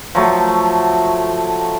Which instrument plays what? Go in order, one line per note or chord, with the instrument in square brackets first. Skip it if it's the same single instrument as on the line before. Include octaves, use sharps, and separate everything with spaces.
[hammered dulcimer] F3 F#3 A3